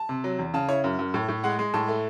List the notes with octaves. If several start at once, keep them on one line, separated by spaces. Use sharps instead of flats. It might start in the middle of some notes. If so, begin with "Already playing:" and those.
Already playing: A5
C3
F#3
E2
C#3 A5
E4 C#5
F#2
F#2
A2
A2
G#3 F#5
G#3
A2 A5
A3